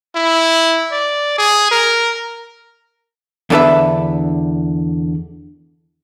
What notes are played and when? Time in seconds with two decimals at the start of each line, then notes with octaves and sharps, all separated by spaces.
0.15 E4
0.92 D5
1.38 G#4
1.71 A#4
3.50 E2 D3 D4 A4 B4 E5